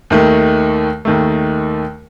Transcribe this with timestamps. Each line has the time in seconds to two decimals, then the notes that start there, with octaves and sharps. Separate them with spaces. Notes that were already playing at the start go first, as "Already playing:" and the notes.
0.10 D#2 D#3 A3
1.05 D#2 D#3 A3